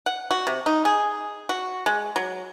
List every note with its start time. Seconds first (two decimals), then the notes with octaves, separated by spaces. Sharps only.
0.06 F#5
0.31 F#4
0.47 C3
0.66 D#4
0.85 G#4
1.49 F#4
1.86 G#3
2.16 F#3